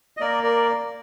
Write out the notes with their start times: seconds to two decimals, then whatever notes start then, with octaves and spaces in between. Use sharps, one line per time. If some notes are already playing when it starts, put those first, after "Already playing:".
0.17 D#5
0.20 A#3 A#4 D5
0.43 A#4 D5